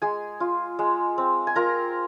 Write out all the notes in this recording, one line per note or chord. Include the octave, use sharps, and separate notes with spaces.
G#3 G#4 G#5
F4
G#3
C4
G#5
F4 A#4 A#5